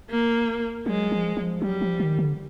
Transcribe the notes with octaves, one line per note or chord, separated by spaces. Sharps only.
A#3
F#3 G#3
F3
F3
F#3 G3
F3
D#3
D3